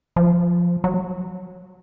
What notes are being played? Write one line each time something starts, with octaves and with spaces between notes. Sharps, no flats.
F3
F#3